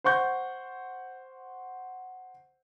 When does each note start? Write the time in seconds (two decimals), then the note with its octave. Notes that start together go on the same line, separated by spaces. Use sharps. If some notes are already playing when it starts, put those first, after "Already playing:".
0.04 C5 F#5 C#6 G6